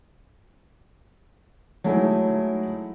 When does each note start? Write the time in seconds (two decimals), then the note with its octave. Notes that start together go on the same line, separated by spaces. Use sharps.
1.84 F#3 G#3 A3 D#4 E4